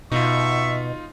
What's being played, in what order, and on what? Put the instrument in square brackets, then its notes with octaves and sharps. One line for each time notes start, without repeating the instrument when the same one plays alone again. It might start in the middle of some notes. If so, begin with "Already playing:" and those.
[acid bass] B2 [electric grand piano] D#4 F4 [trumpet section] E5 C#6